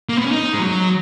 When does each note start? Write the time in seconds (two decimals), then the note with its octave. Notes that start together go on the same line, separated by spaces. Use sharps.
0.09 A#3
0.17 B3
0.24 C#4
0.32 D#4
0.54 G#3
0.60 F#3